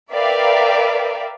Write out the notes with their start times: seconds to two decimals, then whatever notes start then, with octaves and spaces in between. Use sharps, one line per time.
0.12 A#4 B4 D5 E5 F5 G5